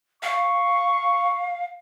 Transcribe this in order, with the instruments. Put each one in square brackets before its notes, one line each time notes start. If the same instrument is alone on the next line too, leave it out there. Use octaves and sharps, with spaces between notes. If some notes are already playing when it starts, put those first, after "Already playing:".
[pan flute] F5 [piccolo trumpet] C#6